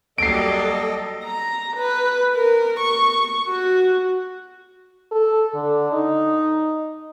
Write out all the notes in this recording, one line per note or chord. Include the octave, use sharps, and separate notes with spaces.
F#3 G3 A#3 A4 D#5 C7 D7
A#5
B4
A#4
C#6
F#4
A4
D3
D#4